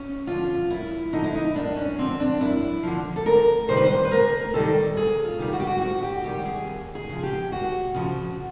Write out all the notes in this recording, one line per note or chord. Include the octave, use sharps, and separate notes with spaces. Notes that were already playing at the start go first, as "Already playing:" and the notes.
Already playing: C#4
D3 F3 F4
F#2 E4
D3 F3 D#4
E4
D#4
F#2 D4
C#4
D3 F3 C4
D4
F#2 E4
D3 F3
A4
D2 A#4
C3 D#3 G3 C5
B4
C5
B4
D2 A#4
C3 D#3 G3 A4
D2 G#4
F4
C3 D#3 G3
F#4
G4
F#4
D2 F#4
G4
C3 D#3 G3 G4
G#4
D#2
G#4
C#3 F3
G4
D#2 F#4
C#3 F3